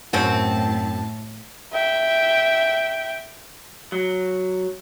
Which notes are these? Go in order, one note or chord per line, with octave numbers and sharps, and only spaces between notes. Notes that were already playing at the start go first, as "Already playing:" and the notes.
F#2 A2 C4 F#4 A5
E5 G5
F#3